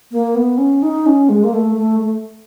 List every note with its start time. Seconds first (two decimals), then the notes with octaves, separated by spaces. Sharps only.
0.12 A#3
0.35 B3
0.58 C#4
0.83 D#4
1.06 C#4
1.29 G#3
1.44 A#3
1.53 A3
1.76 A3
2.00 A3